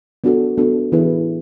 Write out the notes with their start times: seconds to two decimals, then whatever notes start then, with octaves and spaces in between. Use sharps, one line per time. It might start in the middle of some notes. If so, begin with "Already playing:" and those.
0.24 B3 D4 F#4 A4
0.58 B3 D4 F#4 A4
0.92 E3 B3 E4 G#4 B4